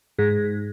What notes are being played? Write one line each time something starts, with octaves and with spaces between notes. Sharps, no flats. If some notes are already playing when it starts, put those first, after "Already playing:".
G#2